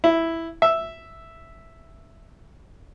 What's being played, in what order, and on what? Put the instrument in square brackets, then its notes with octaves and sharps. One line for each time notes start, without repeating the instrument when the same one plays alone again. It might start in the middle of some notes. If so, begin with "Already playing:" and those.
[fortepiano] E4
E5